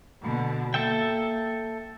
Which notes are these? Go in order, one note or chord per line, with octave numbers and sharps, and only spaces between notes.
B2 D3
A#3 A4 E5 G5